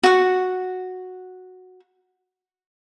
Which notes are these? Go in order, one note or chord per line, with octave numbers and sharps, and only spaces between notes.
F#4 F#5